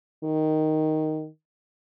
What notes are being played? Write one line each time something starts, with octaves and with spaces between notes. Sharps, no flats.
D#3